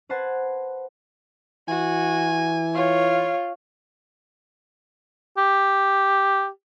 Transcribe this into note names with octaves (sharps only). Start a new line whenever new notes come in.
B4 C5 F#5 A5 F#6 G#6
E3 F#4 G#5
F4 C#5
G4